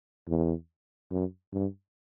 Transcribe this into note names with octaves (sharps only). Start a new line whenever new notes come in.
E2
F#2
G2